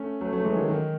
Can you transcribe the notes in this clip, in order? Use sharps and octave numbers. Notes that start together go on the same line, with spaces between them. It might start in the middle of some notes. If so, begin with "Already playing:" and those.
Already playing: A3 C#4
F#3 A3
F#3 A3
E3 G#3
D#3 F#3
D#3